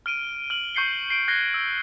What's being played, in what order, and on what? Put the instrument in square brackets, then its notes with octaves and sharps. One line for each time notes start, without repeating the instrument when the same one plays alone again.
[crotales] F6 D7 D#7
F6 F#7
C#6 G6 C7 C#7 G7
C7 D7
F#6 G#6 A#6 C7 G7
E6